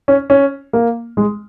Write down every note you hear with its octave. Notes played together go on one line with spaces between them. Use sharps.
C#4
C#4
A#3
G#3